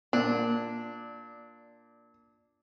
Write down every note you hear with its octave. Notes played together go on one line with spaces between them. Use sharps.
A#2 D4